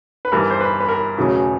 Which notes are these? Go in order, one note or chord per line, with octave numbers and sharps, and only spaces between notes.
B4
G1 G2 E3 A#4
C5
B4
B4
A#4
E1 E2 C#3 F#3 A3